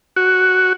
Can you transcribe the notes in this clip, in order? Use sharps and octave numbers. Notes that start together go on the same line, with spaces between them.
F#4